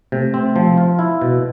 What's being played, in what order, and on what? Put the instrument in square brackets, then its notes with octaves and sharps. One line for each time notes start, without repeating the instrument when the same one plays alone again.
[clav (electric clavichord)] C3 [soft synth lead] A3
[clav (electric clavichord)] C4
F3
F4
E4
B2